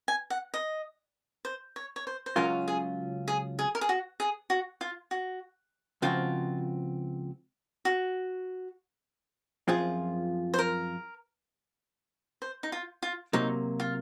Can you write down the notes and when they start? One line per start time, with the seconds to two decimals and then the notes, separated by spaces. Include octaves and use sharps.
0.08 G#5
0.30 F#5
0.54 D#5
1.45 C5
1.76 C#5
1.96 C#5
2.07 C5
2.26 C5
2.36 C#2 C#3 F#3 C#4 F4 A#4
2.68 G#4
3.28 G#4
3.59 G#4
3.75 A#4
3.81 G#4
3.89 F#4
4.20 G#4
4.50 F#4
4.81 F4
5.11 F#4
6.02 C#2 C#3 F3 C4 F4 F#4
7.85 F#4
9.68 F#2 F3 C4 F4 G#4
10.54 C5
10.59 A#4
12.42 C5
12.63 D#4
12.72 F4
13.03 F4
13.33 C3 F#3 A#3 D#4
13.80 F4